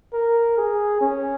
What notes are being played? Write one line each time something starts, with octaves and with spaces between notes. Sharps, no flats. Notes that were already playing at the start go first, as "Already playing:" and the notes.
A#4
G#4
C#4